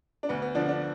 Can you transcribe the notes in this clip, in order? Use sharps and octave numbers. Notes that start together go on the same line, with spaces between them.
D4
D2 B3
B3
D3 F3 D4
D4